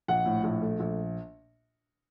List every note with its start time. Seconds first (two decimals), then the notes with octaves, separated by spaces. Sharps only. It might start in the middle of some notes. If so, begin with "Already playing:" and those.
0.08 A#1 F#5
0.26 A2
0.44 A#1
0.62 A3
0.80 A#1